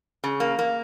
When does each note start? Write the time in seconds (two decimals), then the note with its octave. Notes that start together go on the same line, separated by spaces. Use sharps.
0.24 C#3
0.40 A#3
0.59 A#3